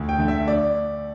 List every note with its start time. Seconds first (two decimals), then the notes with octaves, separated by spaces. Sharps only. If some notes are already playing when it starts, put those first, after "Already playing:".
Already playing: D2
0.09 G5
0.18 D3 A3
0.28 E5
0.48 D5